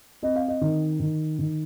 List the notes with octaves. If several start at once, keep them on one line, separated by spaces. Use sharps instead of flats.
C4 D#5
F5
D#5
D#3
D#3
D#3